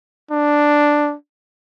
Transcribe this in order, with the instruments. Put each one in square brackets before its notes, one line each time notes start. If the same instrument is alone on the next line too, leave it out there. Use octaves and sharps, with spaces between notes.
[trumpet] D4